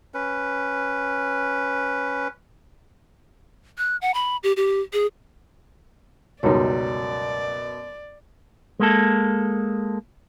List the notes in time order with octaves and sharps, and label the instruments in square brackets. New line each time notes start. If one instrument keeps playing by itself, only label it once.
[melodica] C#4 B4
[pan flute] F#6
F#5
B5
G4
G4
G#4
[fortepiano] C#2 G3 D#4 [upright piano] F#2 B2 [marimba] C#5 C6 [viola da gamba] D5
[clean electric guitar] G#3 A#3 A4